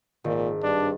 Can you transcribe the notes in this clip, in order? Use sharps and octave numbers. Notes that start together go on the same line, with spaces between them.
G#1 A#2
G2 D4